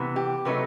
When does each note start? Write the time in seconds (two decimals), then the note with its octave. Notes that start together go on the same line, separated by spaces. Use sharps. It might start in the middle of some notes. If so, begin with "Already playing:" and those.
Already playing: C3 E3 B3
0.16 G4
0.45 C3 F#3 A3 D#4 B4